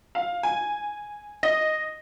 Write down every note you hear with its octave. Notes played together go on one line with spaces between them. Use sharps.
F5
G#5
D#5